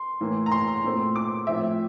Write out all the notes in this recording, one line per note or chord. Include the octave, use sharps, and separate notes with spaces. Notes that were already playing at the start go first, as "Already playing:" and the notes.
Already playing: C6
A2 E3 A#3
A#5
C6
A#2 A3 C4
D6
A2 F3 C4 E5